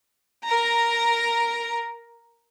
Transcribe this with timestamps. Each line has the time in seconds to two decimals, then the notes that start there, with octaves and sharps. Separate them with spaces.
0.45 A#4 A#5